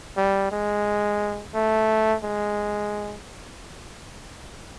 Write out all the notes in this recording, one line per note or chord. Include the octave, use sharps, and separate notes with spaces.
G3
G#3
A3
G#3